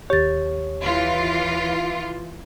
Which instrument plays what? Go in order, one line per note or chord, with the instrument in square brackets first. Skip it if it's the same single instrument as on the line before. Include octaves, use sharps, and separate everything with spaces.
[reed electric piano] D#2 C#5 [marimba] G4 A6
[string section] E3 F4